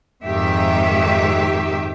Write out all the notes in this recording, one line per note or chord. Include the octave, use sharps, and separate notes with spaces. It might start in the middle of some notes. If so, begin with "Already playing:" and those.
F2 G#2 D#3 G4 E5